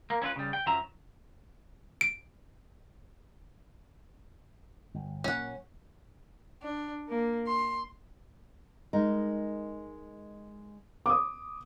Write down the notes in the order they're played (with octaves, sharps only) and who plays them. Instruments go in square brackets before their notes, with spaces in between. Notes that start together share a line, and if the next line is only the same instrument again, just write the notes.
[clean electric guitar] A#3
C#4 E4 F4 B4
C#3 G3
G5
F#2 F3 F#3 E5 A#5
[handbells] D7
[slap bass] G1
[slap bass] A#2 F#3 A#3 [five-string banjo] C#4 F#5
[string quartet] D4
A#3
C6
[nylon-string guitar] G#3 D#4 A#4
[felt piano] D6 D#6